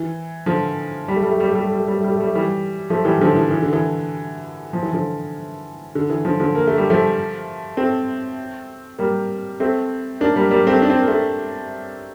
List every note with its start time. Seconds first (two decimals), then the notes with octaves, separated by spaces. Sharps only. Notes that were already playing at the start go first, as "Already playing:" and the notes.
Already playing: E3
0.46 D3 F3
1.08 G3
1.16 A3
1.23 G3
1.31 A3
1.40 G3
1.48 A3
1.55 G3
1.63 A3
1.72 G3
1.79 A3
1.88 G3
1.96 A3
2.04 G3
2.12 A3
2.20 G3
2.27 A3
2.35 E3 G3
2.90 F3 A3
3.05 E3 G3
3.21 D3 F3
3.36 E3
3.51 E3
3.62 D3
3.73 E3
4.73 F3
4.83 E3
4.93 D3 F3
5.95 D3
6.10 E3
6.25 D3 F3
6.40 D3 F3
6.55 A#3
6.67 A3
6.78 G3
6.90 F3 A3
7.77 A3 C4
8.98 G3 A#3
9.60 A3 C4
10.20 A#3 D4
10.35 G3 A#3
10.51 G3 A#3
10.66 A3 C4
10.82 D4
10.90 C4
10.99 A#3
11.08 A3 C4